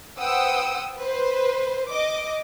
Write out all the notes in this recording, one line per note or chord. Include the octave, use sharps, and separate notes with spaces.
B4 C5 F#5 G5 D#6 E6
B4 C5
D#5 D6